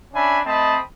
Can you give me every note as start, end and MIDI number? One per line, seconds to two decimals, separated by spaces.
0.14 0.40 61
0.14 0.40 62
0.14 0.40 76
0.14 0.40 80
0.14 0.40 83
0.45 0.77 57
0.45 0.77 60
0.45 0.77 75
0.45 0.77 81
0.45 0.77 83
0.45 0.77 87